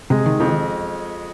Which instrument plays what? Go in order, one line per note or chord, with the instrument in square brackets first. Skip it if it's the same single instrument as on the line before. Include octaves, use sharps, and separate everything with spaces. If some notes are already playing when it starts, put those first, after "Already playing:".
[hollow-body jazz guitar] C3 [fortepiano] G#3
[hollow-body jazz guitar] D#3
[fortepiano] F2 [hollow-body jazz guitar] C3